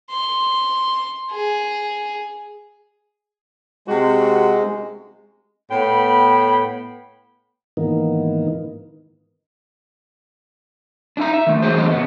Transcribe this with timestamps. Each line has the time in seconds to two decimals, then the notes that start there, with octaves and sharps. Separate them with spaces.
0.10 C6
1.31 G#4
3.88 C3 G#3 C4 F#4
5.71 A2 B3 G5 B5
7.77 G#2 D#3 E3 A#3 B3 D#4
11.17 D4 D#4 E5 A#5
11.34 E5
11.47 D#3 A3
11.62 E3 F#3 G#4 C5
11.78 E2 A2 D3 D#5
11.91 C#3 B3